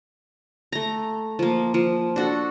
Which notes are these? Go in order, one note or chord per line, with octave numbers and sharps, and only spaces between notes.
A3 A#5
F3 A#3
F3
D4 F#4 A4